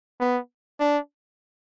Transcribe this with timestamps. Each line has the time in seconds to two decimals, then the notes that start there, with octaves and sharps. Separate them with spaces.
0.21 B3
0.80 D4